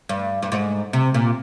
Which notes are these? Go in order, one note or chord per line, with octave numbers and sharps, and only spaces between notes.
G2
G2
G#2
C3
A#2